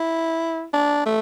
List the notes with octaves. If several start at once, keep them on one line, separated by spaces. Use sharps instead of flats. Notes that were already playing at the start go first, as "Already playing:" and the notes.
Already playing: E4
D4
A3